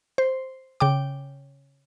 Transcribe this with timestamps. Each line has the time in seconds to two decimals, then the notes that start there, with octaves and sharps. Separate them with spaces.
0.18 C5
0.80 C#3 G5 D6